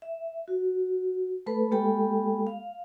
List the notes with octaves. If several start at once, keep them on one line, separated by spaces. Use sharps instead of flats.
E5
F#4
A3 A4 B4 B5
G#3 A#3 G4 A4 G5 B5
F5